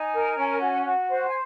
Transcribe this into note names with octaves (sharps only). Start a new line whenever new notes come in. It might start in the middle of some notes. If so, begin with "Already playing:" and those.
Already playing: D#4 G#5
A#4
C#4
F#4
F#4
C5
G#5